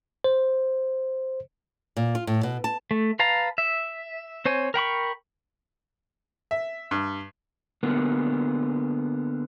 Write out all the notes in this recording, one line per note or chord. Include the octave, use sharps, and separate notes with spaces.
C5
A#2
F4
A2
B2
A5
A3
B4 F5 A5 A#5
E5
C4 C5 C#5 G#5
A#4 G5 B5 C#6
E5
G2
D3 A#3 B3